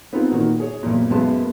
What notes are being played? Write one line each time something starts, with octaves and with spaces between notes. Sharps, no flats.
B3 C4 D#4 F4 G#4
A#2 D#3 F#4
G#4 C#5
B1 A#2
B1 F#2 G#3 B3 A5
A#3